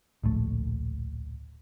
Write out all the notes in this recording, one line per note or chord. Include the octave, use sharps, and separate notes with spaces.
D1 A#1 A3